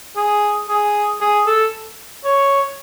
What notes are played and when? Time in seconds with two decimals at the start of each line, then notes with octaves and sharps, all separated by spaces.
0.16 G#4
0.69 G#4
1.21 G#4
1.47 A4
2.24 C#5